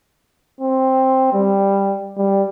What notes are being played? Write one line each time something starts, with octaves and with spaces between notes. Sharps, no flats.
C4
G3
G3